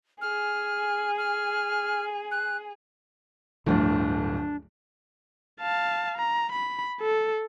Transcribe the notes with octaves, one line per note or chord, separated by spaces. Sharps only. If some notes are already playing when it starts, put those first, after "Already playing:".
G#4 G#5 F6
F6
F#6
D1 G1 D2 D3 F3 F#3 D4
F5 A5
A#5
B5
A4